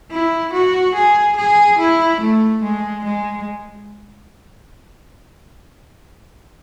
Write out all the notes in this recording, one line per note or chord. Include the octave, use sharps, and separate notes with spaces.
E4
F#4
G#4
G#4
E4
A3
G#3
G#3